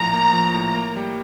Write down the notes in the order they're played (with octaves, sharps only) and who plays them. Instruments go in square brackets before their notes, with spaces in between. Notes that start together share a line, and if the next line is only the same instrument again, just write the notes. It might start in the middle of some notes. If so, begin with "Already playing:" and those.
Already playing: [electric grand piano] A#1 A2 F3 [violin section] A#5
[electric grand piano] A#3
F3
A2
A#3
G3